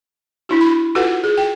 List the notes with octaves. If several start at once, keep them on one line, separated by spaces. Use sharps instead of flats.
D4 E4 F#4
B5
F4 F#4 A4 B4 F#5
G#4
G5